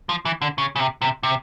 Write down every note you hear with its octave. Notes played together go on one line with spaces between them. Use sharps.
F3
E3
D3
C#3
C#3
C3
C3
C3